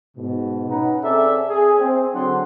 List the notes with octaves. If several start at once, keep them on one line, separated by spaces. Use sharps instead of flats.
G#2 B2
C#4 D#4 B4 F#5 A#5
C4 G#4 A4 D5 E5
G#4
C4
D3 F#3 C4 D4 F#5 C6